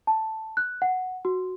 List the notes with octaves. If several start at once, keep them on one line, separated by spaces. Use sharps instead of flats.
A5
F#6
F#5
F#4